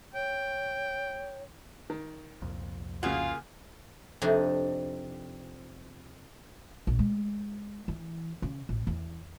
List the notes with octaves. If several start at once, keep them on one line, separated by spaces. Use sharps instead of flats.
C#5 G5
D#3
C2 F2 A#2
C#3 A#3 F4 F#4 G#4
F2 C3 D4 D#4
A#1
G#3
E3
C#3
A1
E2